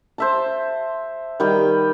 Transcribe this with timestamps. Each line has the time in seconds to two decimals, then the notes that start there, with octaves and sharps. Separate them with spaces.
0.18 C5 E5 A5
1.40 D#3 G3 G5